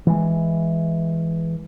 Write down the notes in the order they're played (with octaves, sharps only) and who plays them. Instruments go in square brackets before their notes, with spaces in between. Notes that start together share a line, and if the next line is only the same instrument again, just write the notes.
[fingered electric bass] E3 G#3